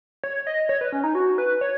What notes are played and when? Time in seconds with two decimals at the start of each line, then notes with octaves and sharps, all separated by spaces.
0.24 C#5
0.47 D#5
0.69 C#5
0.81 B4
0.92 C#4
1.04 D#4
1.15 F#4
1.38 B4
1.61 C#5